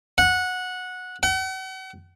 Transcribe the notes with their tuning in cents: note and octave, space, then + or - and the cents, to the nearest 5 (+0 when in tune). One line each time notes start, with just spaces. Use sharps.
F#5 -15
F#5 +40